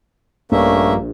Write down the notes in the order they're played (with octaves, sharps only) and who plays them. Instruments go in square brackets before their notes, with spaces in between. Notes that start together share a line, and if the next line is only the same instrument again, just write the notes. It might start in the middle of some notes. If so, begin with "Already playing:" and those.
[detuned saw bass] A#1 [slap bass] G2 [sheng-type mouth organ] A3 C#4 E5 [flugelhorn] A#3